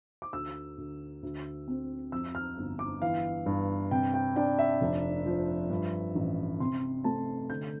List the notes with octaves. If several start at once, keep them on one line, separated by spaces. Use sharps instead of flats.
D6
D2 E6
D2
D2
C4
F2 E6
F6
G1
D6
E3 F5
G2
C3 G5
G5
D4 G5
E5
F1
F3
G2
A1
C3 C6
A3 A5
D3 G6